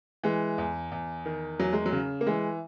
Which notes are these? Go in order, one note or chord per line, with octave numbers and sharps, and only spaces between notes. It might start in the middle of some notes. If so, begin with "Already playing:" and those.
E3 G#3
E2
E2
D#3
E2 F#3
G#3
F#3
C#3
A#3
E3 G#3